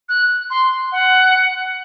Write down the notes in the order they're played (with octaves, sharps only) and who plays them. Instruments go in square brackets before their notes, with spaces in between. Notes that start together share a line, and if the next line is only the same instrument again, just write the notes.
[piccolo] F#6
C6
F#5